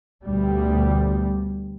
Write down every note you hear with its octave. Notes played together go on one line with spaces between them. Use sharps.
D2 B2 G3